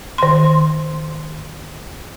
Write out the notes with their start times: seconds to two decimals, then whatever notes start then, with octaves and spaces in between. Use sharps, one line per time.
0.18 D#3 C6